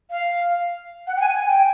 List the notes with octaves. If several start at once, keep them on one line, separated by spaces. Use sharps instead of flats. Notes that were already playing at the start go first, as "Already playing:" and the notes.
F5
F#5
G5
G#5
G#5
G5